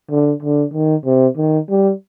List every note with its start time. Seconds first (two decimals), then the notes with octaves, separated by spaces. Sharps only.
0.10 D3
0.42 D3
0.73 D#3
1.05 C3
1.37 D#3
1.69 G3